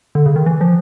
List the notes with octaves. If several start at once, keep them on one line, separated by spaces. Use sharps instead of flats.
D3
C#3
D#3
E3
F3